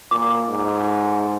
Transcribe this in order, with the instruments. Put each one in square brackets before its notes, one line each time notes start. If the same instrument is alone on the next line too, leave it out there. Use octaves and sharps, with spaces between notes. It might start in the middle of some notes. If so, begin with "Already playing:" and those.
[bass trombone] A#2 [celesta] D6
[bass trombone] G#2